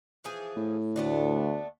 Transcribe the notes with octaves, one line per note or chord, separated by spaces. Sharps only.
E3 F3 G#4
A2
D2 A3 B3 D4